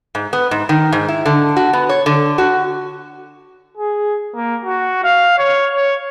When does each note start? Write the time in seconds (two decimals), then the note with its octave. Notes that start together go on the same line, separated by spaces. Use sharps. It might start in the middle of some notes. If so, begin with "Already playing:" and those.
0.15 G#2
0.33 B3
0.51 G#2
0.69 D#3
0.92 G#2
1.08 E4
1.26 D3
1.56 F#4
1.73 B3
1.89 C#5
2.06 D3
2.38 F#4
3.77 G#4
4.35 A#3
4.65 F#4
5.04 F5
5.38 C#5
5.75 C#5